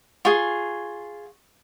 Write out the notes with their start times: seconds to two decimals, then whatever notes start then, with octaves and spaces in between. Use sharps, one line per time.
0.25 F4 G#4 C#6